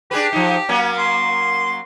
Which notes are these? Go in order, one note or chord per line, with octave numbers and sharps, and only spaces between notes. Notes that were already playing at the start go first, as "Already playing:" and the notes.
D4 G4 G#4 B4
F3 D#4
F#3 A#3 C#4
C6